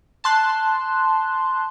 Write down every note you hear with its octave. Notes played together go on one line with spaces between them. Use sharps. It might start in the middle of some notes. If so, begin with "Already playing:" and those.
A5 C6 F#6